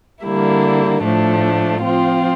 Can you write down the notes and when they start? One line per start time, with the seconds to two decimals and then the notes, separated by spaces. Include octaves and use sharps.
0.24 D3 G3 A#3 E4
1.03 A2 F3 A3 D4
1.82 F3 C4 F4